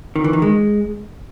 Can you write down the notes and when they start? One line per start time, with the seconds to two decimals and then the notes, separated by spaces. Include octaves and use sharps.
0.16 D#3
0.24 E3
0.33 D#3
0.42 G#3